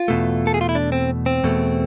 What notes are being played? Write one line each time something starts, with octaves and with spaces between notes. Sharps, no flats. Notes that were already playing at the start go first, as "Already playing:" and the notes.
Already playing: F4
E2 B2 A3
A4
G#4
F4
E4
D4
C4
C4
E2 B2 A3